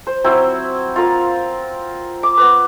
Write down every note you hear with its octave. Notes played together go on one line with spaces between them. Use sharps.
C5
F#3 C4 E4
F4 A#4 F5
D6
B3 B4